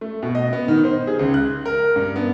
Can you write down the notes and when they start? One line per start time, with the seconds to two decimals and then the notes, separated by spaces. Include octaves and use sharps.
0.01 A3
0.23 B2
0.35 D#5
0.53 B3
0.68 D#3
0.84 C5
1.07 G#4
1.19 C#2
1.34 F#6
1.66 A#4
1.96 G2
2.16 B3